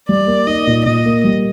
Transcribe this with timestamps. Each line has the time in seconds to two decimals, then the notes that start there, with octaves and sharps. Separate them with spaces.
0.09 G3 D5
0.27 A#3
0.47 D#4 D#5
0.67 A#2
0.86 A#2 D#5
1.05 A#3
1.24 G3